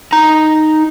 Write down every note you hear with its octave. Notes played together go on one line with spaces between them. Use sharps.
D#4 A#5